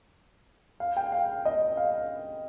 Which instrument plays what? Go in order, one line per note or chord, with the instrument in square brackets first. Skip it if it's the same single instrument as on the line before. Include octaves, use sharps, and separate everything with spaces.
[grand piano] F5
G5
F5
D#5
F5